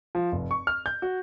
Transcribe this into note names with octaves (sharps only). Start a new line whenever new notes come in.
F3
F1
C#6
F6
G6
F#4